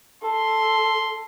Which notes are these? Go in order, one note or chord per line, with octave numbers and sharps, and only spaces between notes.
A4 C6